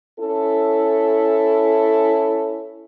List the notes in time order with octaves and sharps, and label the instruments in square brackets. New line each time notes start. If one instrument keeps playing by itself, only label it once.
[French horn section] C#4 E4 A4